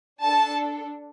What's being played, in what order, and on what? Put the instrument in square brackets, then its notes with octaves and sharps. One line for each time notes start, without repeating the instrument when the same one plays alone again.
[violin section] D4 A4 A5